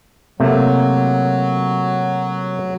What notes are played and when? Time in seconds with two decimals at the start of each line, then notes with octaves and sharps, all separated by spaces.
0.40 C3 F#3 A3 A#3